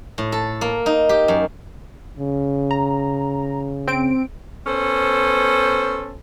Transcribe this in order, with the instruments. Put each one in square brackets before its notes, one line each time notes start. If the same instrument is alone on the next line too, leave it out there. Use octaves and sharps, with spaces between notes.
[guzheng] A2
A4
A#3
D#4
G4
F#2
[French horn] C#3
[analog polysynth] A#5
C4 D7
[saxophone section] B3 C#4 A4 C5